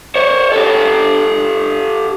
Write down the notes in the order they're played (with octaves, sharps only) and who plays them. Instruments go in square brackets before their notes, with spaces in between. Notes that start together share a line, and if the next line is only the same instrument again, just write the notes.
[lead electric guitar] C5 C#5
G4 A4